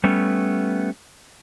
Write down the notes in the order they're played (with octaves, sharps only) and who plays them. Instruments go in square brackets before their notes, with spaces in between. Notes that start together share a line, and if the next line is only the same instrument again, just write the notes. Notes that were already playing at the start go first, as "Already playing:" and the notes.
[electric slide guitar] G3 A3 B3 C#4